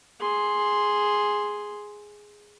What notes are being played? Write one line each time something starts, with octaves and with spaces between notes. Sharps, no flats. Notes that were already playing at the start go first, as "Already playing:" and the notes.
G#4 C6